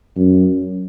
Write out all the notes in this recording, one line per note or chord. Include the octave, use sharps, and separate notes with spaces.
F#2